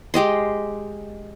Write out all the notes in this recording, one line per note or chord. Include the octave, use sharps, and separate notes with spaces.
G#3 G4 D#5 C6